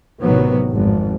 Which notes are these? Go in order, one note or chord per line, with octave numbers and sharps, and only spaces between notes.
A1 C3 D#3 F#3 B3
G#1 F2 G#2